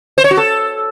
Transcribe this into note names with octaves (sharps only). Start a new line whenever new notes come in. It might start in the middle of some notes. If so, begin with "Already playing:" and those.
C5
C#5
F#4
A4